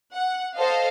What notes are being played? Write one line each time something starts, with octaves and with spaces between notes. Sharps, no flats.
F#5
A4 C5 D#5 F5